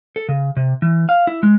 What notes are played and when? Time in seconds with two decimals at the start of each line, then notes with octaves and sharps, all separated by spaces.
0.16 A4
0.29 C#3
0.57 C3
0.82 E3
1.09 F5
1.27 E4
1.43 G#3